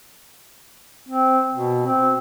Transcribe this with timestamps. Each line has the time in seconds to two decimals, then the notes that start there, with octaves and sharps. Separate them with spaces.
1.09 C4
1.52 B2
1.86 C4